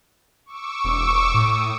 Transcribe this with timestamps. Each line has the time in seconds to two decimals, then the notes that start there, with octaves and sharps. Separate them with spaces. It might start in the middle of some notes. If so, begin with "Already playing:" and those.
0.46 C#6 D6 E6
0.84 E1
1.34 A2 D#6